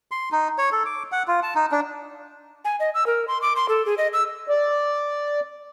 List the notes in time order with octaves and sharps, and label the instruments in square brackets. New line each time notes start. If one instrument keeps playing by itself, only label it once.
[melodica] C6
D#4
C#5
A4
D6
F#5
F4
A5
D#4
D4
[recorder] G#5
D#5
E6
A#4
C6
D6
C6
A4
G#4
D#5
E6
[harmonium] D5